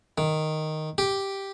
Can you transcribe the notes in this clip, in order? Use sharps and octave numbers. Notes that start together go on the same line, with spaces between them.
D#3
G4